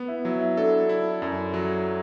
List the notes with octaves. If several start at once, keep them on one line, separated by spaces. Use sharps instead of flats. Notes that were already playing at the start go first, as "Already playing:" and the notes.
Already playing: B3
E4
F#3 E4
E4
D4 A4
E4
F#2
F#3